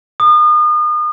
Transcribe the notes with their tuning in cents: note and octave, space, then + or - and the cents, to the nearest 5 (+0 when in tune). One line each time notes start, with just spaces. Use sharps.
D#6 -35